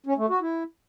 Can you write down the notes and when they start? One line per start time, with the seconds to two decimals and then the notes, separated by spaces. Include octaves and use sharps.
0.06 C#4
0.18 A3
0.29 F#4
0.41 E4